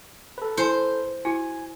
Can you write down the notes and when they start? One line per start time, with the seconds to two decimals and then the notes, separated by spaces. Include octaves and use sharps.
0.38 A4 B4
0.57 E4 C5 G#5
1.25 E4 F#4 G#5